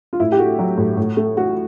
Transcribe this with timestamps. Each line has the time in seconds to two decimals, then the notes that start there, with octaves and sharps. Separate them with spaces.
0.13 F4
0.20 A2 E4
0.32 G4
0.39 A3 F#4
0.59 F#3
0.78 A2
0.97 A2
1.17 A3
1.37 A3 F#4